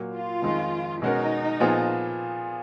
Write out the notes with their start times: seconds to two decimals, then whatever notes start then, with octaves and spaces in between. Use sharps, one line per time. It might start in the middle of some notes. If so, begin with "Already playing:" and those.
Already playing: A#2 F#3 A#3
0.12 F4
0.42 F2 D#3 G#3 D#4
1.02 B2 G#3 C#4 D#4 F#4 A#4
1.60 A#2 F3 B3 F4 G#4